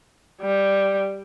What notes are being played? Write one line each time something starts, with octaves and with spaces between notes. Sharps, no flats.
G3